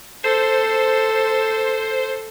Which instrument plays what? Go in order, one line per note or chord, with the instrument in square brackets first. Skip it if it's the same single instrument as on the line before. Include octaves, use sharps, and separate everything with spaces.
[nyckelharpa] A4 [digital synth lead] C5